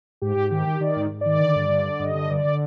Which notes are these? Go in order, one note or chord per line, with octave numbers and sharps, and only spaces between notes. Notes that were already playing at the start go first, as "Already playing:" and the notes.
G#2 G4
G#2
D#3 G4
D#3
D#3 D5
G#2
G#2
D#3 D5
D3
G2
D3
D3
G2 D#5
D3
D3 D5
D3